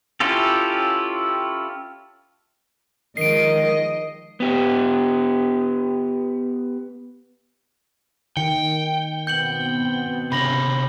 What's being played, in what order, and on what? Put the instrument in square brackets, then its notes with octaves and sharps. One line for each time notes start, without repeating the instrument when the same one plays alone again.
[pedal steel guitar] C#4 E4 F4 G4 A4
[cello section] D#3 F3 G#3 [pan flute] A#4 [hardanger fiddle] D#5 [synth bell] C7 D7
[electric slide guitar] B3 G4
[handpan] D#3 [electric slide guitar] G5 [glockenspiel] C#7
[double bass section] B2 B3 C4 [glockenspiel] G6 C#7 F#7
[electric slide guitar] C3 C#4 [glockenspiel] B5 A#6 F#7